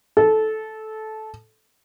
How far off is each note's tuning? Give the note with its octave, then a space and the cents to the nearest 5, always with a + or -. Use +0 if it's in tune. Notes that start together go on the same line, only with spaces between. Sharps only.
A4 -15